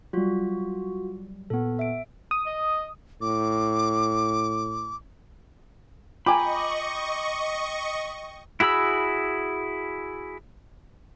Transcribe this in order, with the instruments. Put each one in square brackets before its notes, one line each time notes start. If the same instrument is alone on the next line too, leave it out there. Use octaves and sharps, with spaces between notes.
[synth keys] F#3 G3 [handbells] F4 F#4
[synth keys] A#2 [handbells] B3 A4
[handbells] E5 D7
[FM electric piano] D#6
[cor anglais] D#5
[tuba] A2 [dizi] D6
[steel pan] F4 G#5 A#5 [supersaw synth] D#5 C#6 [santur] G5 D6 [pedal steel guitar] B5
[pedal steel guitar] E4 F#4 G#4 B5 E6